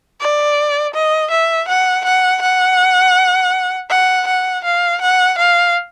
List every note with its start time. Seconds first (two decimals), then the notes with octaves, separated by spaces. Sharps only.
0.20 D5
0.94 D#5
1.31 E5
1.68 F#5
2.05 F#5
2.42 F#5
3.90 F#5
4.27 F#5
4.64 F5
5.01 F#5
5.38 F5